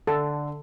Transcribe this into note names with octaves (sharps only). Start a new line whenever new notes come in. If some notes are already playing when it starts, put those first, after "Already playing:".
D3 A4